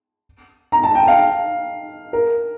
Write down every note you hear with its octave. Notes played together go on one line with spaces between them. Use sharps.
A#5
A5
G5
F5
A#4